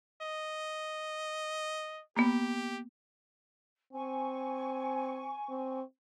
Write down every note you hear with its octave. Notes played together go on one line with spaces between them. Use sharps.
D#5
A#3 B3 G4
C4 G#5 C#6
C4